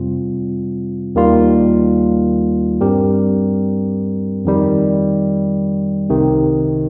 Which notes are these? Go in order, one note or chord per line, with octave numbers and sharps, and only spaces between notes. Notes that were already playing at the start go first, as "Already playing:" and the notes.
Already playing: F2 C3 G3 C4 F4
D#2 D#3 G3 A#3 F4
G2 G3 C4 G4 A#4
F2 D#3 G3
C2 C3 D#3